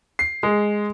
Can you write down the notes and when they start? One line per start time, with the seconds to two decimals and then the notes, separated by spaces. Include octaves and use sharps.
0.19 C7
0.43 G#3